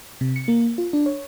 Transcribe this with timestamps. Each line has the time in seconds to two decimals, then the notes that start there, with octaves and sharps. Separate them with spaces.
0.21 C3
0.36 C#7
0.48 A#3
0.78 F4
0.93 D4
1.06 C#5